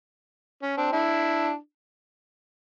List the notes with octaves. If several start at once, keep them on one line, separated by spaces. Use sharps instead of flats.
C#4
C4 D4
D4 E4